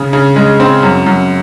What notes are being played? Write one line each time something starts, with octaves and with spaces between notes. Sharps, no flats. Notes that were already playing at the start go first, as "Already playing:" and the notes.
Already playing: C#3
C#3
G#3
C4
F#2
F#2